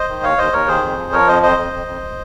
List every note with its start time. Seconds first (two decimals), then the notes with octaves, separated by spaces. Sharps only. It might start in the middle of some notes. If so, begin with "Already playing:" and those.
Already playing: C5 D#5
0.09 D#3
0.23 D#2 C#5 F5
0.38 D#2 C5 D#5
0.53 D#2 A#4 C#5
0.68 D#3 G#4 C5
0.83 F2
0.98 F3
1.12 F3 A#4 C#5
1.28 F2 C5 D#5
1.42 F2 C5 D#5
1.58 F2
1.73 F2
1.87 F2